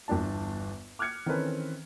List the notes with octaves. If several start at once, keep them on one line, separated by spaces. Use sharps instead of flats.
G1 E2 D4 A5
D6 F6 F#6 G#6 C#7
D#3 E3 C4 C#4 A4 B4